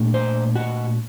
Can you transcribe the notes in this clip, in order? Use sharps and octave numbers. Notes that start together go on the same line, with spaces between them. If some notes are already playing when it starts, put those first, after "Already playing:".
Already playing: A#2 A3 D4
C5
F#4